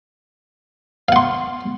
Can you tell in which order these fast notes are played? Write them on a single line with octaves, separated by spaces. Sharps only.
F5 F#5 C6